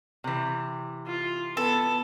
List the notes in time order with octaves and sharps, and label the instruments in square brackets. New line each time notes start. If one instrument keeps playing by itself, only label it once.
[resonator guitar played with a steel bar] C3 E3
[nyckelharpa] F4
[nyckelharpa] B3 [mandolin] A4